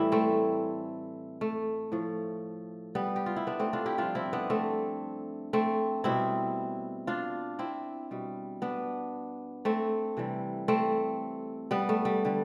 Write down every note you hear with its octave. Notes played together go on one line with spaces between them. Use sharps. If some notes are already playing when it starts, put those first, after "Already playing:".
Already playing: A2 E3 G3 E4
A3 C4
A3
A2 F3
G3 B3
G4
F4
E4
B3 D4
A3 C4
D4 F4
E4 G4
G2 F3 D4 F4
C4 E4
B3 D4
A3 C4
A3 C4
B2 G3 C4 E4
D4 F4
C4 E4
B2 G3
B3 D4
A3 C4
C3 E3 G3
A3 C4
G3 B3
A3
G3
D3 G3